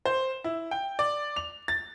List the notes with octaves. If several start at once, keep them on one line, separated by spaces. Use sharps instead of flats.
C5
E4
G5
D5
F7
A6